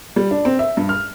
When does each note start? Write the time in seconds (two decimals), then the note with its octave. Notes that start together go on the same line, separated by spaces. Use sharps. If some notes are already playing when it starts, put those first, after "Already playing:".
0.16 G3
0.31 D4
0.45 C4
0.59 E5
0.77 G2
0.89 F6